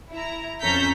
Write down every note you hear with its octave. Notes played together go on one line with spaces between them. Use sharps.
E4 A#5
F2 C#4 A4 A#5 G6 B6